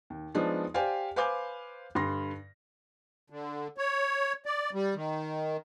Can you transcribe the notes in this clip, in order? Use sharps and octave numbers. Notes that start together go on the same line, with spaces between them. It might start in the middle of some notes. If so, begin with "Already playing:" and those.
D#2
F3 G#3 B3 D4 D#4
G4 C5 D5 F5 G#5
B4 C5 F5 G#5 D6 G6
G2 D3 C6 A#6
D3
C#5
D5
G3
D#3